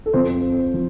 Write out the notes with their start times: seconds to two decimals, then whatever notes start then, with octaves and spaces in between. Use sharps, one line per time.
0.06 A4
0.13 F2 F3 C4 C5
0.74 F3